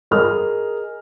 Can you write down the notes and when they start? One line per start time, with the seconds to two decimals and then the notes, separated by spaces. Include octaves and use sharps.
0.11 G#4 A#4 D#5 F6